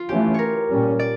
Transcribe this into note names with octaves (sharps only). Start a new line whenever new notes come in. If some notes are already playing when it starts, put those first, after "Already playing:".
Already playing: F4
E3 A3 C#4 G4
A#4 C#5
A#2 G3 C#4
D5